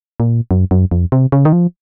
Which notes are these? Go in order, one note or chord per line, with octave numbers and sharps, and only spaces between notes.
A#2
F#2
F#2
F2
C3
C#3
D#3
F3